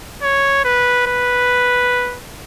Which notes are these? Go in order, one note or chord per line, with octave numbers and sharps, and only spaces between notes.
C#5
B4
B4